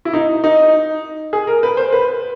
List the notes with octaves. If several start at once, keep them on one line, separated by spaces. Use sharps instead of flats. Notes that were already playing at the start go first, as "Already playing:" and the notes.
E4
D#4
D#4
G#4
A#4
B4
C5
B4